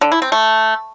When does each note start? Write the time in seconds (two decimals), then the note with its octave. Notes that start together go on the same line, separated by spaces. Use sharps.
0.01 D3
0.12 E4
0.22 C4
0.32 A3